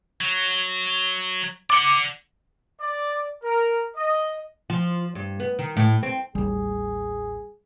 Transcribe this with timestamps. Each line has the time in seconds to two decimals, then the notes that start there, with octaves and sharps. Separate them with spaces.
0.21 F#3
1.70 D5 F#5 D6 C#7
2.80 D5
3.43 A#4
3.96 D#5
4.70 F3
5.15 G2
5.40 B3
5.59 D#3
5.77 A2
6.03 C4
6.35 A1 D#2 G3 G#4